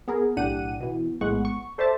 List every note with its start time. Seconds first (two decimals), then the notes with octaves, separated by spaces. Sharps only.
0.08 B3 G#4 A#4
0.37 B1 A2 D4 G4 F#5 D#7
0.80 B2 E3
1.21 A#1 A2 G#3 B3 F#5 C#6
1.45 C#6
1.78 A4 C5 D5 E5 A5